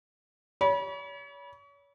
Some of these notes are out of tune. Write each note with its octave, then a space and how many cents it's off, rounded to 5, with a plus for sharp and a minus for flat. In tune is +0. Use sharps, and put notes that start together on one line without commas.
C#5 +35 B5 -30